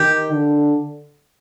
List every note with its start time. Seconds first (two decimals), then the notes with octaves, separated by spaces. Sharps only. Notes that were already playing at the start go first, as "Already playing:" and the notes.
Already playing: D#3 G4
0.31 D3